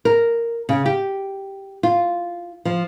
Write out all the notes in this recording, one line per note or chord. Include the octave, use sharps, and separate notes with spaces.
A#4
C#3
G4
F4
F3